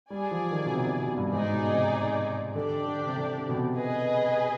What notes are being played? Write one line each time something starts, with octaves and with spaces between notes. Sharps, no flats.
G3 G#4 D5 G#5
F3
D#3
B2
C3
C3
B2
G2
G#2 D#4 G#4 D5 G#5
B2
C3
D3 D4 G4 D5
D3
C3
D3
D3
B2
C3
G#4 B4 D#5 G#5